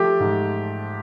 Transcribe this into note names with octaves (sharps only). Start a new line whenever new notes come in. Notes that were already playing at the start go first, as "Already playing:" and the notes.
Already playing: F3 A3 G4
G#2